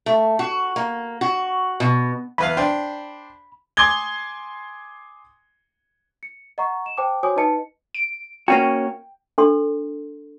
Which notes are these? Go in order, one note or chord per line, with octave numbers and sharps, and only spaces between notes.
A3
F#4
A#3
F#4
B2
E2 B4 F5 B5
D4 C5 G5
G#5 C6 D6 D#6 G#6 G7
C#7
D#5 F#5 A#5 C#6
E7
C5 G5 A5 D6
F#4 C5 C#5 G#5 D6 D#6
D#4 B4 D#5 A5 C#7
D7
A#3 C#4 F#4 G5
D4 A4 C6